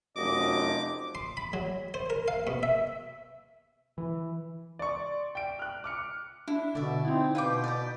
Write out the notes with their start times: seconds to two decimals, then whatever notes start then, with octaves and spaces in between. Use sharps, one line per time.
0.17 F1 F#2 D#5 D6
1.15 C6
1.37 B5
1.53 F#3
1.94 C5
2.10 A#4
2.28 F5
2.47 B2
2.63 E5
3.98 E3
4.79 D5 C6 C#6
5.35 G5 D7
5.59 F6 F#6
5.84 D6 F6 C#7
6.48 D4 E4
6.75 B2 D3 D5 E5
7.05 C4 D#4 E4
7.35 B2 F4 B4 B5 D6 G6
7.64 D5 A#5